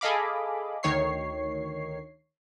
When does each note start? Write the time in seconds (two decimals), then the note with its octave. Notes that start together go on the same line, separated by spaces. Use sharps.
0.01 G#4 A4 D#5 F5 B5 D6
0.83 D2 D#3 C#5 C#6 C7